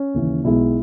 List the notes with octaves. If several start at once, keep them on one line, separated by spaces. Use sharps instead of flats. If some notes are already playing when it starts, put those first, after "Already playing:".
Already playing: C#4
D#2 C#3 E3
B1 B2 G#3 E4